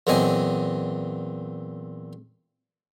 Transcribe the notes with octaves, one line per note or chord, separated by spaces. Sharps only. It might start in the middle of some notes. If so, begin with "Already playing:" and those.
E2 A#2 F#3 C4 D#5 G#5